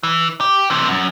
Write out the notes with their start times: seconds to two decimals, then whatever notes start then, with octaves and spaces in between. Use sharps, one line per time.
0.03 E3
0.40 G4
0.70 C3 E3
0.88 F#2